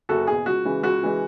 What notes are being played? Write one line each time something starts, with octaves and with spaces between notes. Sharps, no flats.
F#1 F#4 A4
E2 B2 G#4
C#2 F#4
C#3 E3 G#3
C#2 F#4
C#3 E3 G#3